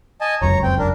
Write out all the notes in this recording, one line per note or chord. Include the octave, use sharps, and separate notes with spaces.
D#5 G#5 A5
F1 C#2 F#2 C#5 A#5
C4 G5
D4 A#4